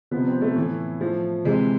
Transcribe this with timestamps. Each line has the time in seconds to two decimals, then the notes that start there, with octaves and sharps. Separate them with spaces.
0.11 C3 F3 B3
0.27 C4
0.41 A3
0.56 A2 E3
1.01 A2 F3
1.45 C3 E3 G#3